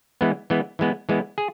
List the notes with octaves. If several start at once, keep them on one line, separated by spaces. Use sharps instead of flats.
E3 G#3 B3
E3 G#3 B3
E3 G#3 B3
E3 G#3 B3
G#4